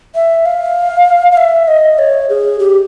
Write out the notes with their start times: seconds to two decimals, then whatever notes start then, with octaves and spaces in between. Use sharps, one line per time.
0.15 E5
0.46 F5
1.32 F5
1.37 E5
1.68 D#5
1.98 C#5
2.29 G#4
2.59 G4